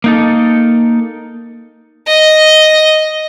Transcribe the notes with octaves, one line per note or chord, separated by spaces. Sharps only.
A#3 D#4 A4
D#5